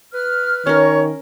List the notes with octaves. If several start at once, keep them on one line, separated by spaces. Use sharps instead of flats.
B4 F6
D#3 C#4 A#4 C#5